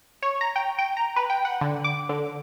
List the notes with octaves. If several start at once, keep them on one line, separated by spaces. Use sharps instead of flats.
C#5
A#5
G5
G5
A#5
B4
G5
F#5
D3
D6
D3